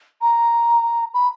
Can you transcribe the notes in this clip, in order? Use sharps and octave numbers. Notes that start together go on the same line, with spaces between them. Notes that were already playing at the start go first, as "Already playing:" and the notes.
A#5
B5